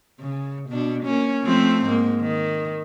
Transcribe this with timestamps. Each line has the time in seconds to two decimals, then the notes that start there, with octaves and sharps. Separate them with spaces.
0.20 C#3
0.69 B2 D4
1.03 A#3 C#4
1.43 F3 A3 C4
1.85 G#2 A#3
2.21 D#3